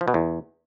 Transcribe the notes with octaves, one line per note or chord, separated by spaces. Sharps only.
F3
B2
E2